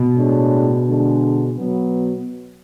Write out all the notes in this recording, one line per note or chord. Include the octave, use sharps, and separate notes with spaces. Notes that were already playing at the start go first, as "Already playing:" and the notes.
Already playing: B2
A2 G#3 D4
D3 G#3 D4
B2 F#3 B3